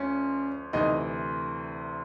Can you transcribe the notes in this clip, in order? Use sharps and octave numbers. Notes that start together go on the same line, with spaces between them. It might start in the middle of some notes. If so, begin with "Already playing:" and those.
Already playing: D2 F3 C#4
D2 C3 E3 D#4